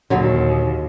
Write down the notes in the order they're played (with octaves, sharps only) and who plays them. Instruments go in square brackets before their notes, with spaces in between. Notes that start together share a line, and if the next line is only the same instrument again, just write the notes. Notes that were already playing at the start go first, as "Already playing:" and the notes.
[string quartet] D#2 [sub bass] A#2 [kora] D3 F#3 G#4